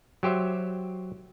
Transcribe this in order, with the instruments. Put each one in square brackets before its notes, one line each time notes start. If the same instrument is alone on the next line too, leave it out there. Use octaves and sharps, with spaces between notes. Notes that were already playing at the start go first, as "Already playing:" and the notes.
[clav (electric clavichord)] F#3 G4 C5 E5